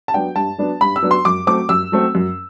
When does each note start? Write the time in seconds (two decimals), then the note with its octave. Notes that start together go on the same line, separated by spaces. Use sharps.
0.08 A5
0.14 F#3 B3 D4 G5
0.36 G2 A5
0.58 F#3 B3 D4
0.81 G2 B5
0.96 E6
1.02 F#3 B3 D4
1.11 C6
1.25 F#2 D6
1.47 F#3 A3 C4 D6
1.69 F#2 E6
1.92 F#3 A3 C4
2.15 F#2